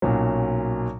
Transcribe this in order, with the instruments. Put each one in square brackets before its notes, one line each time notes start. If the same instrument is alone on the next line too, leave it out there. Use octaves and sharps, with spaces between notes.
[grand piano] B1 A#2 F#3 C#4